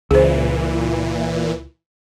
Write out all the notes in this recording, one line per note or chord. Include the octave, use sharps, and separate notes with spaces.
C#2 A#2 E3 G#4 C5